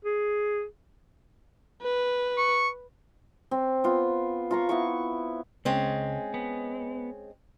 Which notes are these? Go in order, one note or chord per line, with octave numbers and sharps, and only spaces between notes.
G#4
B4
C#6
C4
B3 F4
F4 A#5 C#6
B3 E4 C#6
C#2 G#3 C4 C#4
B3